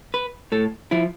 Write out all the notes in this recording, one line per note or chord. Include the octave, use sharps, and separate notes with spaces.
B4
A2 A4
F3 E4